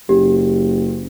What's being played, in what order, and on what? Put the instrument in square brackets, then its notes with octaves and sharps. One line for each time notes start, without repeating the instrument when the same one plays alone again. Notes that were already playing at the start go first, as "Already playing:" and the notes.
[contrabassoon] F#1 [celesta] G4